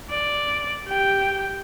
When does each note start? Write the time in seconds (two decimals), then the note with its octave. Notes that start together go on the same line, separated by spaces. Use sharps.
0.11 D5
0.88 G4 G5